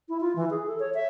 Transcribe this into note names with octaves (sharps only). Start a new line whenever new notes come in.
E4
F4
E3
G#4
A4
C#5
E5